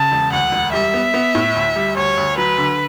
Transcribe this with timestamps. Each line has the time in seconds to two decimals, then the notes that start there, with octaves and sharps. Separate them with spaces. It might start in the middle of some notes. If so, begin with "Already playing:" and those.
Already playing: C#3 A5
0.12 E1
0.32 D2 F#5
0.52 E1
0.73 G3 E5
0.94 B3
1.14 B3
1.35 A2
1.55 D2
1.76 G3
1.96 D2 C#5
2.17 D2
2.38 F#3 B4
2.58 D3